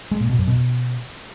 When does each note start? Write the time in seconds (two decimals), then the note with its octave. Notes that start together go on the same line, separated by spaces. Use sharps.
0.11 G#3
0.21 A#2
0.30 B2
0.39 F#2
0.48 B2